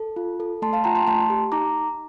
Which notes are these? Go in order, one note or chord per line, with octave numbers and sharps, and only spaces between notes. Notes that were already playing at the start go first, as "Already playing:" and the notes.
Already playing: A4
F4
A4
A3 A5 C6
F5 A5
F4 G5 A#5
A5 C6
A3 A5 C6
G4
D#4 A#5 D6